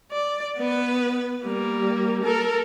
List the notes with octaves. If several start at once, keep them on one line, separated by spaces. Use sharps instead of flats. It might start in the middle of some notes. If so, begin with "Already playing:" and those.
D5
B3 B4
G3 A#3
A4 A#4